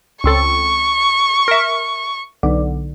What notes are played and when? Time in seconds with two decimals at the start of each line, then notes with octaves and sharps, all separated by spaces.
0.24 C#2 C4 A4 C#6
1.48 A#4 E5
2.43 B1 D3